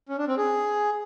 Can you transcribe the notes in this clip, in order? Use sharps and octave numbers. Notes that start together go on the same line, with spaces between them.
C#4
D4
C4
G#4